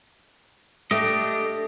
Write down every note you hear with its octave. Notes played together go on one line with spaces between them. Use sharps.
A3 D4 G4 D#5